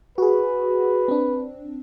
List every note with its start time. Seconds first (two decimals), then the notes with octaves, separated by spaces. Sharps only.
0.18 F#4 G#4 B4
1.08 C4 D4